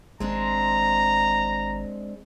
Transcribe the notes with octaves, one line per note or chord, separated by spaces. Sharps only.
G#1 G#3 C4 D4 A#5